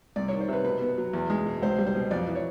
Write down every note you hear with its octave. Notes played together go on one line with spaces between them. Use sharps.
C2 D5
D#3 C#5
C5
C3 B4
B2 B4
B3
F#3
E2
G#3
B2
C#2 C5
G3
C5
B2
F2 D5
E3
C#5